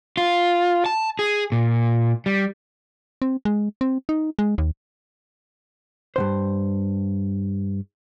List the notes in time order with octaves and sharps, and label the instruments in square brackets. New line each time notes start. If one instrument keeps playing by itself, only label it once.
[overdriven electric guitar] F4
A5
G#4
A#2
G3
[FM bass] C4
G#3
C4
D#4
G#3
D#2
[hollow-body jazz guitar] G2 C3 C5